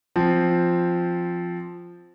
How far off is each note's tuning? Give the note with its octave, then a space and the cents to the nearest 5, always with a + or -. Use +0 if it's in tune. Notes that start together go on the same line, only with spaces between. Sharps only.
F3 +0 C4 +0